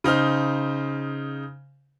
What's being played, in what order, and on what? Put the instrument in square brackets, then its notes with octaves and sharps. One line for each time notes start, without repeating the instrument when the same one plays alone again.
[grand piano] C#3 D#4 C5 F6